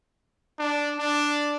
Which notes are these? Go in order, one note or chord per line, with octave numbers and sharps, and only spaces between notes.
D4
D4